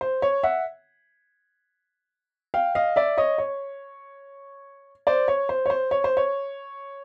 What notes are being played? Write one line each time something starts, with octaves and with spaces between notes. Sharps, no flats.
C5
C#5
E5 F#5
F5 G5
D#5 F5
D5 E5
C#5 D#5
C#5
C5 D5
C#5
C5
C#5
C5
C#5
C5
C#5